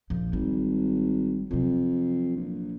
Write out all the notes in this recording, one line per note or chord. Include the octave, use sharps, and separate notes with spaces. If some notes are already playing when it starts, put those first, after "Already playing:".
A#1 F3
G#1 G3
F2 C3 F#3
A#1